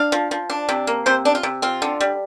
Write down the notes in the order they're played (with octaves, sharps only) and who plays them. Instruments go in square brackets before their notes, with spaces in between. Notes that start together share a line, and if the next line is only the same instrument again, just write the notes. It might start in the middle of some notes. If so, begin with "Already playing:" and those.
Already playing: [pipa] D4 F5
F3
F3
D4
C3
A#3
C3 C5
D4
F4
C3
C4 F4
D3
G3